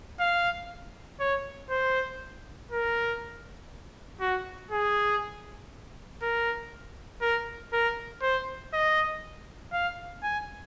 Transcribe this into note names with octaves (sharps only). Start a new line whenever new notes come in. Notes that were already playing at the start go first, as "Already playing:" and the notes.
F5
C#5
C5
A#4
F#4
G#4
A#4
A#4
A#4
C5
D#5
F5
G#5